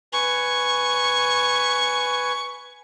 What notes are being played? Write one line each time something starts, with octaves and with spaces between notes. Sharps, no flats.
B4 G#5 C#6